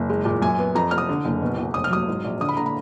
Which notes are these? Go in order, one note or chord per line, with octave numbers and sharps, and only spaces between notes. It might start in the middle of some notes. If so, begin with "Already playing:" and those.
Already playing: F#1
G#3
A#2
F#2 G#5
B3
F2 A#5
F1 F6
D#6
D3
F#1
B2
B1
F1 D#6
F6
F#3 D#6
G#2
A#1
D3 D#6
B5
D3 A#5
B5